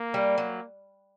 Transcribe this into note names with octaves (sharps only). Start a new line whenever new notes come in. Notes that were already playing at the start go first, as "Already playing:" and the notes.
Already playing: A#3
G3
F#3